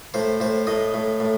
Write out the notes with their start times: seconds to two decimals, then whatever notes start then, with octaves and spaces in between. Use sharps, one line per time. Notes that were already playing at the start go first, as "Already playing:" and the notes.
0.14 A2 C5
0.40 A2 C5
0.67 A2 D#5
0.94 A2
1.20 A2